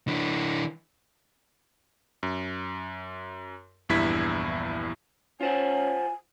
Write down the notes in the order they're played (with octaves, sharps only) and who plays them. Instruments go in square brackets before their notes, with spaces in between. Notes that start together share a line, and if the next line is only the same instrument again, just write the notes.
[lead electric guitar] E3 D4
[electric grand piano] F#2
A#1 E2 G2 E4 G#6 B6
[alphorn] C#4 [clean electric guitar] F4 C5 F#5 [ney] G#5